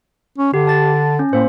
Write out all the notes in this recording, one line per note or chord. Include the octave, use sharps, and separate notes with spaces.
C#4
D3 G4
A5 A6
C#4
A2 A#3 C5